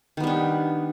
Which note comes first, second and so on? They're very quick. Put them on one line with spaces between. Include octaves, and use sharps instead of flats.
D#3 B3 G3 D4